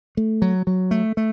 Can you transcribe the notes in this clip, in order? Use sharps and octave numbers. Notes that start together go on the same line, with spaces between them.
A3
F#3
F#3
A3
A3